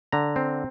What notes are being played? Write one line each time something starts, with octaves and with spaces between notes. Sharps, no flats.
D3 A#5
C4